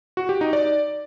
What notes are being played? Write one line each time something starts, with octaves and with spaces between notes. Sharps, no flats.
F#4
G4
D#4
D5